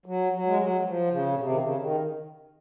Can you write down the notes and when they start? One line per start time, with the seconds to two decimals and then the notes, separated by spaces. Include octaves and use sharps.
0.06 F#3
0.32 F#3
0.46 G#3
0.59 F#3
0.81 F#3
0.85 F3
1.11 C#3
1.32 A#2
1.39 C3
1.50 D#3
1.59 C#3
1.78 D#3